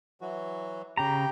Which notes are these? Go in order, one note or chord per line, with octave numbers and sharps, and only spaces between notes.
E3 F#3 F#4
C#3 G4 G5 A#5